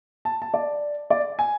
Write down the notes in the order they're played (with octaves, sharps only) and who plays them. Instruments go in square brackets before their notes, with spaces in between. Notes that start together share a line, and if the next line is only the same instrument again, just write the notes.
[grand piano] A5
A5
D5
D5
G#5